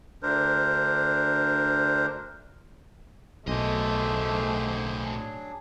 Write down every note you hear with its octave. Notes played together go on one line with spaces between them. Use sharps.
D2 D4 A#4 C5
B1 A2 A3 A#3 G#4 C5 D#5
F#3 D4 G#4